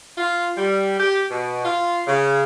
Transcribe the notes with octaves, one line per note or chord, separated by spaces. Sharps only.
F4
G3
G4
B2
F4
C#3